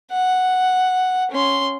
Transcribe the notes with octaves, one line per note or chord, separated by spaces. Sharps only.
F#5
C#4 C6